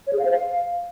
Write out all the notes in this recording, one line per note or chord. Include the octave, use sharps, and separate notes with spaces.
C#5
G#4
F5
C5
F5